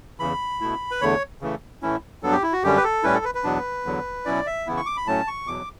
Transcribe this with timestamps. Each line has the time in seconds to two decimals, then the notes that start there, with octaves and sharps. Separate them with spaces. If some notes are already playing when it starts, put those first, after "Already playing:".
0.19 E2 C#3 E3 B5
0.61 B2 A3 E4
0.91 B4
1.01 E2 D3 A3 C#5
1.41 C#3 E3 A3
1.82 A2 E3 A3 C#4 E4
2.22 G2 F#3 B3 D4 A4
2.32 G4
2.43 E4
2.53 F#4
2.63 F#2 D3 G3 C#4 G4
2.77 B4
2.84 A4
3.03 A2 G3 C#4 E4 B4
3.14 A4
3.25 B4
3.35 B4
3.44 E2 B2 F#3 B3 D4
3.85 E2 D3 F#3
4.25 B2 F#3 C#4 E4 D5
4.47 E5
4.67 C#3 E3 B3 E4
4.77 C#6
4.86 D6
4.97 B5
5.06 A2 F#3 A3 C#4 A5
5.28 C#6
5.47 E2 B2 F#3 D6